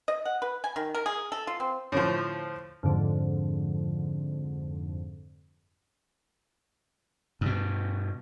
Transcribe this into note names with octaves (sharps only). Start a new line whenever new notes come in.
D#5
F#5
B4
G#5
D#3
A#4
G#4
A4
F4
C4
A2 D3 F3
F2 G#2 D3
G2 B2